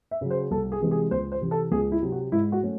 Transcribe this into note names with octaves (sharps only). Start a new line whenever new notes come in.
E5
C#3 F#3
C5
C2 A4
G#4
C3 E3 G#3 C4
G#4
C#2 C5
C5
C3 E3
A4
C#2 G#4
E4
C3 F#3
F#4
G#2 E4
F#4
F#3 A3 C#4